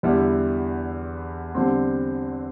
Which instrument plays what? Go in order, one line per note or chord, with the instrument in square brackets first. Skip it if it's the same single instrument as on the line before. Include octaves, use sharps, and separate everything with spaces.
[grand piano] E2 D3 G3 E4
E2 D3 G3 C4